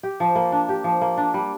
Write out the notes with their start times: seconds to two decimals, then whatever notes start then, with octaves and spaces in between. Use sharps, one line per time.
0.03 G4
0.20 F3
0.35 A#3
0.52 D4
0.69 G4
0.84 F3
1.01 A#3
1.17 D4
1.34 G3